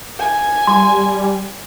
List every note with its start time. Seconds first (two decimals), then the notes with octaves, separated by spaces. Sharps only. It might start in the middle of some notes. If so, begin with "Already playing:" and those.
0.19 G#5
0.67 G3 C6